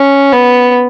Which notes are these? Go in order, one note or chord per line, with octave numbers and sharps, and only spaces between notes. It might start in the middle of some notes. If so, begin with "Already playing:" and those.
Already playing: C#4
B3